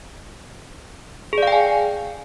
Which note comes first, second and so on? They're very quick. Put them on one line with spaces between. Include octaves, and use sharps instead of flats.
G#4 D5 F5 G5 G#5